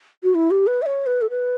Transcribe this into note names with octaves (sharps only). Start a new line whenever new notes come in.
F#4
E4
G4
B4
E5
C#5
B4
A4
B4